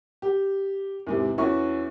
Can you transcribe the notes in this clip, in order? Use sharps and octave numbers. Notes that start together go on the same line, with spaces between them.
G4
E2 G#2 C3
E2 C#4 E4 F#4 C#6